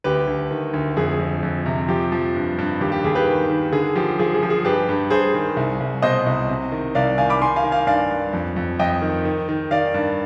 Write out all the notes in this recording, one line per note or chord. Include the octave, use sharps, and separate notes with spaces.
D2 G4 B4
D2
D#3
D2
F2 G#4
F2
F2
C3
F3 G4
F3
G2
G2
D#2 G4
G4
D#2 G#4
G4 B4
D#3
D#3
D3 G#4
F3 G4
F3 G#4
G#4
F3
G#4
G2 G4 B4
G2
G2 G#4 C5
D#3
C2
C2
B2 C5 D#5
C2
C3
D#3
C2 D5 F5
D#3 F5 G#5
B5 D6
D#3 G#5 C6
F5 G#5
D#3
F5 G#5
G2 D5 F5
G2
F2
F2
F2 D#5 G5
D#3
D#3
D#3
D#3 D5 F5
G2